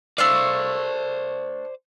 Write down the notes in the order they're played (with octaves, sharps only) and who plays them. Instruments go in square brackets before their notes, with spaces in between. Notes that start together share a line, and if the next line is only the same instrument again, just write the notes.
[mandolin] A3 D4 F5 [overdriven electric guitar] C5 D5